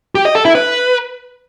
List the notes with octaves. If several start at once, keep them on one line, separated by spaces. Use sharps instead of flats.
G4
D#5
A4
E4
B4